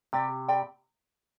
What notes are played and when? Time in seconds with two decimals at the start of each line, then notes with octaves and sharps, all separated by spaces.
0.13 C3 G4 D5 G5 B5
0.48 G4 D5 G5 B5